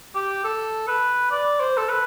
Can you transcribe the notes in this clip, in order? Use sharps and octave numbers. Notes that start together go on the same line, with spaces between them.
G4
A4
B4
D5
C5
A4
B4